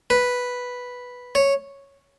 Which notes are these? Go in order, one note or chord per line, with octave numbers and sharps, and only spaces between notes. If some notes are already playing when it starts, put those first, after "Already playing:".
B4
C#5